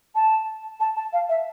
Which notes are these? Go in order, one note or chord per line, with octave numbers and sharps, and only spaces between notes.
A5
A5
A5
F5
E5